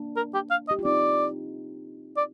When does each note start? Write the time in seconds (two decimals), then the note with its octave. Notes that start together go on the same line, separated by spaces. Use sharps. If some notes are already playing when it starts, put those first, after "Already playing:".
Already playing: A#3 D4
0.17 A#4
0.34 G4
0.51 F5
0.68 D#5
0.71 G4
0.79 F4
0.85 C4 D#4 D5
2.17 D5